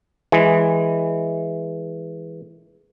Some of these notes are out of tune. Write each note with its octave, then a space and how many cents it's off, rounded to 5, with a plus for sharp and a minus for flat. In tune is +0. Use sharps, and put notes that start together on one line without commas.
E3 +0 G#3 +0